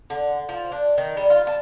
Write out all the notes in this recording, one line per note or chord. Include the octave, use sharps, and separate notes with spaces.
D3
F3
D4
D#3
G3
F4
A5